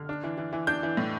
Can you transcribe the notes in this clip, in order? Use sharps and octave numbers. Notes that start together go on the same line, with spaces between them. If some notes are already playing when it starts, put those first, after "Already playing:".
Already playing: D3 F6
D4
E3
E3
E3
D4 G6
E3
A2